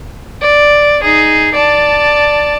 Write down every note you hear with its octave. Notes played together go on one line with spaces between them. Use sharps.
D5
D#4 G#4
D5 A5